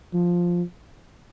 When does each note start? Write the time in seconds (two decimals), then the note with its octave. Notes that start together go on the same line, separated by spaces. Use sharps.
0.14 F3